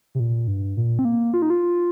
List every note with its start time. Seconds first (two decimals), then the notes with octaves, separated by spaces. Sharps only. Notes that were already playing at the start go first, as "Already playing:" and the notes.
0.15 C3
0.20 A#2
0.47 G2
0.77 A#2
0.99 C4
1.05 A#3
1.34 F4
1.42 D#4
1.50 F4